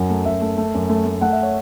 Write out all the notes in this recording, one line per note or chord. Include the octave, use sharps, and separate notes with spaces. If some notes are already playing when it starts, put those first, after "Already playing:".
Already playing: F#2 F#3
A3
F#2 E5
A3
A3
F#2
A3
A3
A3 F#5
E5
C#5